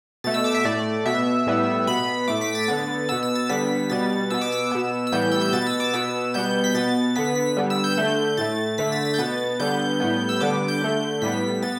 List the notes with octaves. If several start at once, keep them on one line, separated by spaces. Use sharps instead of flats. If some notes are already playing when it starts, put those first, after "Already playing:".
B2 A3 A6
E6
D6
E5
A2 A3 D5
B2 B3 E5
A2 G3 B3
B2 B3 B5
A2 A3 D6
B6
A6
D3 B3
B2 B3 E6
E6
A6
D3 G3 B3 B6
B2 G3 B3 A6
B2 B3 E6
D6
E6
B2 B3
E6
A2 E3 G3 B3 G6
E6
G6
B2 B3 A6
E6
D6
B2 B3 E6
B2 G3 B3 G6
B6
B2 B3 A6
D3 B3 B6
B6
D3 G3 B3
E6
G6
D3 A3
A2 A3 A6
D3 A3 B6
A6
A6
G6
B2 B3 A6
D3 G3 B3 G6
A2 G3 B3
E6
D3 G3 B3 D6
G6
D3 A3
A2 G3 B3 B6
B3 A6